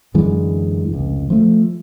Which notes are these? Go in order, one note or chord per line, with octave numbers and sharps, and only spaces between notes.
F#2 D3 E3 G#3
F1 C#2
F3 A3